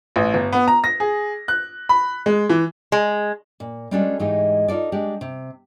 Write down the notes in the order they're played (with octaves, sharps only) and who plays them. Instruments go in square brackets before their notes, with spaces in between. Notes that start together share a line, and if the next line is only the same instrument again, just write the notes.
[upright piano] A1
G1
B3
A#5
A#6
G#4
F#6
B5
G#3
E3
[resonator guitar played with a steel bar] G#3
[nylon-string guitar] A#2
G3 G#3 C#4 D4 F#4 A4
G#2 E3 G#3 A3 D#4 G4
D#4 F4 A4 D5
G#3 D4 G4
C3